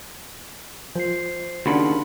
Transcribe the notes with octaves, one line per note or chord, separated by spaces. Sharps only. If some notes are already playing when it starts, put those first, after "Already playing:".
F3 C5 C7
D#2 C#3 D4 F#4 F#5 B5 C6